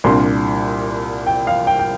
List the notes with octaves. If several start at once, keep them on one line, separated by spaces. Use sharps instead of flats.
C2 A#2 A#3 D4 C6
G5
F5
G5
G5